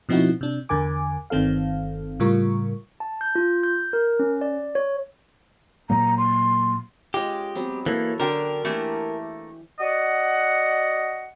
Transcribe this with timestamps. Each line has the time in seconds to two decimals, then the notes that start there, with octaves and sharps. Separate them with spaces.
0.09 B2 F3 C4 D#4 E4 F#4
0.41 C3 D4
0.69 E2 D3 A#4 G#5 D6
1.30 G1 D#3 C4 A4 F5
2.20 A2 C#3 G3 F4 A#4 C#6
3.00 A5
3.21 G6
3.35 F4
3.63 G6
3.93 A#4
4.19 C#4
4.41 D5
4.75 C#5
5.90 A#2 F#3 A#3 A#5
6.18 C6
7.14 G#3 C#4 F4 G4
7.55 F#3 B3 C4
7.86 E3 A#3 A4 C#5
8.20 D3 C#4 D4 F#4 A#4 G5
8.65 E3 A3 A#3 E4 G4
9.80 F#4 D5 D#5 F#5